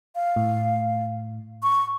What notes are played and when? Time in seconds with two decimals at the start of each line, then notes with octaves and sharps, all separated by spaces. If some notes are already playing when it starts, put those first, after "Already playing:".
0.15 F5
0.36 A2
1.63 C#6